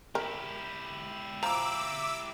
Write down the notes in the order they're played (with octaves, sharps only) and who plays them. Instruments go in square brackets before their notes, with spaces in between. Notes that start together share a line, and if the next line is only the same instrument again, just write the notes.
[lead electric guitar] E4 G4 [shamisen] A#4
[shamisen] F3 [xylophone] A#5 [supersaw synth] D6 E6